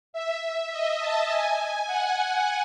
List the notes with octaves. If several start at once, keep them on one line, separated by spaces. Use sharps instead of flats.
E5
D#5
A5
G#5
F#5